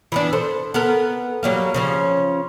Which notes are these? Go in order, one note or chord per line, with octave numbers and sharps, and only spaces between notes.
E3 B3 D4
A4 C5
B3 A4 A#4
F#3 G3 A#3
C#3 F3 C#4